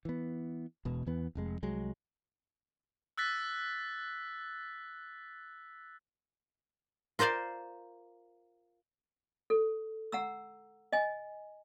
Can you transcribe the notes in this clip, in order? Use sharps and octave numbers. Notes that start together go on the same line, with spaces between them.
E3 B3
E1 B2
E2 E3 B3
F1 F2 G#3
C2 F#3 G#3
E6 F#6 A6 B6
F4 A#4 C5 D5 F5
A4
F#5 A#5 E6
D#5 G#5